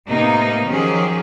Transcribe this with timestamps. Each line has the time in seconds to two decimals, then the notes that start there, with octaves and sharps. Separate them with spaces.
0.11 A2 C3 A#3 B3 D#4
0.69 D#3 F3 F#3 C#4 G4 G#4